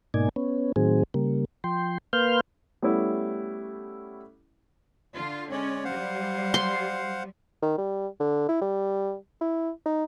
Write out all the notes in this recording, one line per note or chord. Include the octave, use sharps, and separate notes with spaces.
G#2 B2 A#3 D#4 D5 G#5
B3 C#4
A2 D#3 F#3 C4 G#4
C#3 G3 A#3
F3 G5 C6
A#3 B4 F5 C6 F6 G6
G3 A3 B3 C#4 E4
D3 F4
G#3 C#4 C#5 D5
F#3 G3 C5 F5 F#5
C6
D#3
G3
D3
E4
G3
E4
D#4